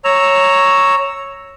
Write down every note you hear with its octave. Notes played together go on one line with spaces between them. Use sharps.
C#5 A#5 E6